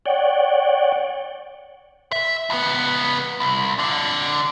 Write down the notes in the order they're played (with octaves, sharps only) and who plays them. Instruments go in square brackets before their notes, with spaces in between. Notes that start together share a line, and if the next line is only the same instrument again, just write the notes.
[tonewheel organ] C#5 D5 F#5 G5
[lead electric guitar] E5
C#2 B3
C2
F2 D3